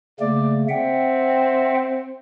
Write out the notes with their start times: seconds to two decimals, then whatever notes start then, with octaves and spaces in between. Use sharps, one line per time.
0.20 C#3 A3 A#3 D5
0.69 C4 E5 F#5 G5